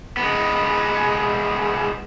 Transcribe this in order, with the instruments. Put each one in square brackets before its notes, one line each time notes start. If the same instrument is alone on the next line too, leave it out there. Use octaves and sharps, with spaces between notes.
[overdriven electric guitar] G#3 B3